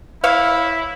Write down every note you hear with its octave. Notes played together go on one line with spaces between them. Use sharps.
E4 C#5 E5 F5